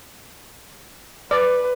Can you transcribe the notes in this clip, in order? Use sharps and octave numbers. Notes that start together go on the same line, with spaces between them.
B4 D5